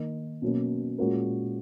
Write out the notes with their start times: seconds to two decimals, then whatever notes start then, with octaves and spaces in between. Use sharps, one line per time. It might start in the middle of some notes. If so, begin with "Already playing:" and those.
Already playing: D#3 A#3 D#4 A#4 D#5
0.42 B2 F#3 A#3 C#4
0.98 A#2 G#3 C#4 F#4 A#4